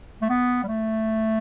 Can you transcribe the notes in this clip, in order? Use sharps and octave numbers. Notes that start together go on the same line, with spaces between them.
A3
B3
G3
A3